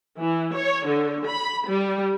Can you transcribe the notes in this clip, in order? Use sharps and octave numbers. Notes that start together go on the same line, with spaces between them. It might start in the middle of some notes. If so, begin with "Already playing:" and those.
E3
C#5
D3
B5
G3